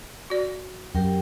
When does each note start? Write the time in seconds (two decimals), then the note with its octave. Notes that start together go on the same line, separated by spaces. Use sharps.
0.30 F#4 D5
0.95 F#2 G4 A#4 G5